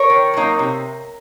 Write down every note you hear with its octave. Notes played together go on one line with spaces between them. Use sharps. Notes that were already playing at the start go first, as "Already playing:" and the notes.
Already playing: A#4 C#5
D#3
F#3 A#3 D#4
C3